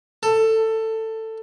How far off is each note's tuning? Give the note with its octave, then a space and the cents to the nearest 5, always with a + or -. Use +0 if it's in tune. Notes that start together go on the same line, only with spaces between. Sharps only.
A4 +15